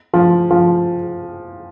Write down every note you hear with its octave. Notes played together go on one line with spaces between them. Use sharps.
F3
F3